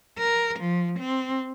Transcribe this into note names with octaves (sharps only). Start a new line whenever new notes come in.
A#4
F3
C4